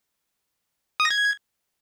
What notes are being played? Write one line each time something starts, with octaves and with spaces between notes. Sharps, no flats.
D#6
A#6
G#6